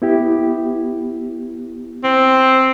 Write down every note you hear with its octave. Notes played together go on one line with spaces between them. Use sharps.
B3 E4 G4
C4